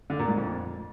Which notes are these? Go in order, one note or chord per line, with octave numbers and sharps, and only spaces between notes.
D3
A#2
G#2
F2